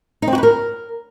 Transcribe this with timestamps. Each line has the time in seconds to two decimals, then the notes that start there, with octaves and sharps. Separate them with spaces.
0.22 D#4
0.27 C4
0.33 F#4
0.38 B4
0.43 A#4